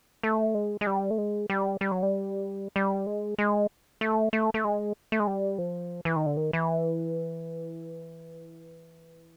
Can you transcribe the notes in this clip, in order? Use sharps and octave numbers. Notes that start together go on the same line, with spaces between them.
A3
G#3
G#3
G3
A3
G#3
G3
G3
F#3
G3
G3
G#3
G#3
A3
A3
A3
G#3
A3
G#3
G3
F3
E3
D#3
D3
D#3
E3